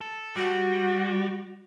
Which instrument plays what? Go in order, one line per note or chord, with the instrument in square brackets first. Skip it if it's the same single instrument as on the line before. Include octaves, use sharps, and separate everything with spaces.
[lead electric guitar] A4
[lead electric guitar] G3 [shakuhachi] F#4